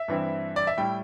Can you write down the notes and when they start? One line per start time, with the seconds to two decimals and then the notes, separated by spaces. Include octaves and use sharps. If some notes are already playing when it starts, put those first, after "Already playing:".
Already playing: E5
0.08 G2 E3 C4 E4
0.56 D5
0.67 E5
0.77 A2 G3 E4 G5